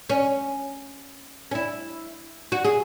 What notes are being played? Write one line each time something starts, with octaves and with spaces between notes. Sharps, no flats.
C#4
C#4
E4
F#4
G#4